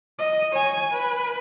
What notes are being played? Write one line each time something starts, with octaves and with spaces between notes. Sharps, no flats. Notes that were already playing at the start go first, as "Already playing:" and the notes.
D#5
C#5 G#5
B4